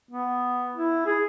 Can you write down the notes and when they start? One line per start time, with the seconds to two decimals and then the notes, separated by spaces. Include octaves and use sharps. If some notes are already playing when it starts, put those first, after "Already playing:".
0.11 B3
0.76 E4
1.06 G#4